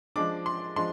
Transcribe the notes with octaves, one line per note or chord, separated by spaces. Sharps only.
F3 G#3 D4 D6
C6
F3 G#3 D4 C6